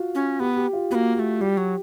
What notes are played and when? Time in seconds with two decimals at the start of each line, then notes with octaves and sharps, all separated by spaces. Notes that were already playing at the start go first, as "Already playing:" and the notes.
Already playing: F4 F#4
0.15 C#4
0.40 B3 G4
0.57 G4
0.73 F4
0.90 B3 F#4
0.95 A#3
1.15 A#3 G4
1.19 A3
1.40 G3 G4
1.57 F#3